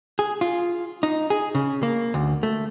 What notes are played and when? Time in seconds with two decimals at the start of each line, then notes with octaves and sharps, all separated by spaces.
0.19 G#4
0.41 F4
1.03 D#4
1.30 G#4
1.55 C#3
1.83 A#3
2.14 D2
2.43 A3